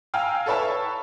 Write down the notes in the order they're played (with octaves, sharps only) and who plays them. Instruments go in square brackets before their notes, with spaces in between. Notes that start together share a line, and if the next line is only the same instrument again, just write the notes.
[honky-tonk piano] F5 G5 G#5 A#5 E6 F6
A4 B4 C#5 E5 A5